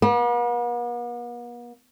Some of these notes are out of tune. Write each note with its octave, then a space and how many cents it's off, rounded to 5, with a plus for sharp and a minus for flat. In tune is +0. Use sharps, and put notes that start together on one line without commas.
B3 -45